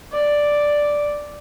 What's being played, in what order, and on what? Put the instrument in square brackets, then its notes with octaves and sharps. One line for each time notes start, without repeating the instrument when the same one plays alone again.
[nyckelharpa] D5